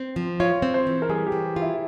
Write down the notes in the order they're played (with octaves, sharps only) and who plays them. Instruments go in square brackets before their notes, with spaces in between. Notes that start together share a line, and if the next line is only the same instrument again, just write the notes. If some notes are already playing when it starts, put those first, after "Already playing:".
Already playing: [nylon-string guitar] C4
F3
[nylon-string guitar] F4 [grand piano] C#5
[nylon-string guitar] C4
[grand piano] C5
[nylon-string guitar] E3
[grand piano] A#4
[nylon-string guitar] G3 [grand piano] G#4
[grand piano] G4
[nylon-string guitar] E3
F4
[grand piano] E4